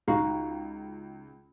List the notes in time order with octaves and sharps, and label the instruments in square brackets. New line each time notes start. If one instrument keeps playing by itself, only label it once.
[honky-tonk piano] C#2 [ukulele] D#4 F#4 F5